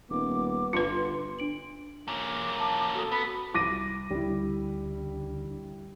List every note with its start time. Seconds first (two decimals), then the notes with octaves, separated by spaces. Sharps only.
0.10 D#1 B3 D6
0.73 G1 F4 B4 C6
1.39 D4 D7 F#7
2.08 A#3 C#4 D6
2.60 A5
2.95 F#4 A4 D#6
3.12 B3 B5
3.54 C2 D6 A#6 D#7
4.11 D2 D3 G3 E4